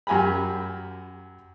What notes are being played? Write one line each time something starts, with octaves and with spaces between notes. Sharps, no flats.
F#2 G4 G#5 A#5 B5